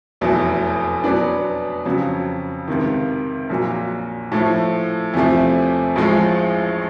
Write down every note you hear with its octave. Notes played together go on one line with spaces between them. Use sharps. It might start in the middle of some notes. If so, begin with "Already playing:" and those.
F1 E2 B2 F#3 A3
B2 F#3 B3 D4
F2 C#3 F#3
C#2 C3 D#3
A#1 A#2 F#3
A2 F3 A3
E2 C3 F3 A3
A1 A2 F3 G#3